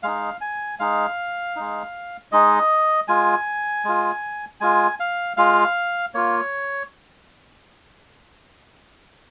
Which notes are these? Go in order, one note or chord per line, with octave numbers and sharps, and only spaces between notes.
G#3 D#4 F5
G#5
G#3 D#4 F5
G#3 D#4
G#3 D#4 D#5
G#3 F4 G#5
G#3 F4
G#3 F4 G#5
F5
G#3 F4 F5
A#3 F4 C#5